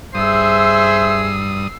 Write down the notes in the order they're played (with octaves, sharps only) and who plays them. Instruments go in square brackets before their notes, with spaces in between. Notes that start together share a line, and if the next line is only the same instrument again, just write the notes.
[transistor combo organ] G2 D#6 [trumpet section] G#4 C5 E5 [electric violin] E6 C7